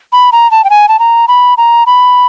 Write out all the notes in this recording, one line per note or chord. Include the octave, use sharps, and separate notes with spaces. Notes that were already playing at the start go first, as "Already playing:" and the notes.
B5
A#5
A5
G5
G#5
A5
A#5
B5
A#5
B5